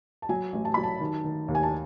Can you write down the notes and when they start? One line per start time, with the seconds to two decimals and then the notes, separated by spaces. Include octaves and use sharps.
0.22 A5
0.29 F#3 G#5
0.53 A1
0.65 A5
0.74 F#3 B5
0.83 A5
1.00 D#3
1.24 D#3
1.48 D#2
1.55 G#5
1.63 A5